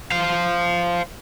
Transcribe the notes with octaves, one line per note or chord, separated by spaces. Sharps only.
C5 F5